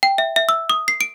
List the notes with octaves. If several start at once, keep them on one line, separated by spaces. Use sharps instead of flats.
G5
E5
E5
E6
D#6
C7
D7